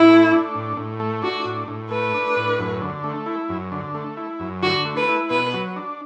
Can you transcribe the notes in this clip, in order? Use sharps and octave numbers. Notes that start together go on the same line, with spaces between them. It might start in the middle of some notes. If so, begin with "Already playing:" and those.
Already playing: A2 E4
A3
D4
A2
A2
A3
D4 F#4
A2
A2
A3 B4
D4
A2
F#2
D3
A3
E4
F#2
D3
A3
E4
F#2
D3 F#4
A3
B4
E4
B2 B4
F#3
D4